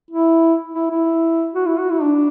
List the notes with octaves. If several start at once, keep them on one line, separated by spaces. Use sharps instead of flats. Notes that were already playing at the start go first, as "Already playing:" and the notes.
E4
E4
E4
F#4
E4
F#4
E4
D4